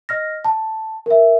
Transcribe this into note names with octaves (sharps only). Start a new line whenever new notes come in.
D#5 F6 A#6
A5
A#4 E5